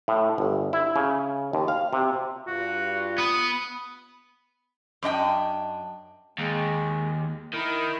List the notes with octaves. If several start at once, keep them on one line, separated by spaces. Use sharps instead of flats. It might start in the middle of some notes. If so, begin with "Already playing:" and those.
A2
G1
E4
C#3
D#2
F5
C3
G2 F4 F#4
B3 B4 D#6
F#2 D4 D#5 G5
D#2 G#3
D#3 E4 A#4